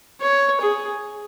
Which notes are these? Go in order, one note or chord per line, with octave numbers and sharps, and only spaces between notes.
C#5
G#4